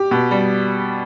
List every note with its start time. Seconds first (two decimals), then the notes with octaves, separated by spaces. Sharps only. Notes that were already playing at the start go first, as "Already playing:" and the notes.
Already playing: G4
0.11 B2
0.31 G3